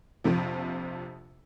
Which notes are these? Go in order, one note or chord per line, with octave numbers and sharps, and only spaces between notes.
A#1 F2 C3 F3